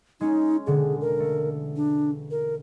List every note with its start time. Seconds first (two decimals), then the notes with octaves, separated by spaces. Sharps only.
0.21 G#3 C#4 D#4
0.67 E1 D3 G#4
1.01 A#4
1.20 A3
1.76 D4
2.31 A#4